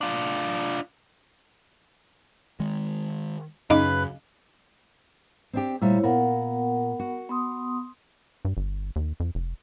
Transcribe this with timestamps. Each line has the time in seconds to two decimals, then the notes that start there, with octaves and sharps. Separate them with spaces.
0.01 D4 F4
2.60 D#3 G#3
3.70 F#2 C#3 D#4 B4 F5 D6
5.53 C4 D4 G4
5.82 A#2 G3 A3 E4 C5 C#5
6.04 A#2 B3 A#4 F#5
7.00 F#4
7.30 B3 C6 D#6
8.45 G2
8.57 G1
8.96 D#2
9.20 F2
9.35 F1